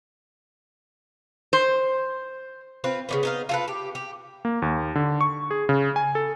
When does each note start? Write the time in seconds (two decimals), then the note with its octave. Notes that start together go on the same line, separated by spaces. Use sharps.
1.53 C5
2.84 C4 F4 B4
3.09 C#3 F3 B3
3.23 B3 D#4 F5
3.49 F4 A4 B4
3.68 G4
3.95 G4
4.45 A#3
4.62 D#2
4.95 D3
5.21 C#6
5.51 G#4
5.69 C#3
5.96 G#5
6.15 A4